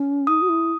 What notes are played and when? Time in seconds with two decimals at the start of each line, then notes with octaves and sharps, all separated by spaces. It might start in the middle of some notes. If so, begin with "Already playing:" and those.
Already playing: C#4
0.27 D#4 D#6
0.42 F#4
0.49 E4